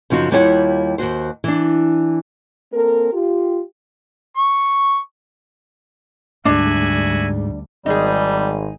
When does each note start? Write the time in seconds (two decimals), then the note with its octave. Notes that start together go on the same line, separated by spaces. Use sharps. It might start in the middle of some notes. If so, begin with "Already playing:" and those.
0.10 F#2 C#3 F3 D#4 F#4
0.31 D#2 G3 E4 F4 C#5 F#5
0.98 D#2 B2 F#4 C5
1.44 E3 D4
2.73 A#3 C4 A4 A#4
3.13 F4 G4
4.37 C#6
6.45 D2 G#2 G3 D4 F#4 E5 G#5
7.86 G#1 G3 D#4 G#4